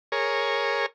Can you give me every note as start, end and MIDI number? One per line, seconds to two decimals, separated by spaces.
0.12 0.86 68
0.12 0.86 70
0.12 0.86 73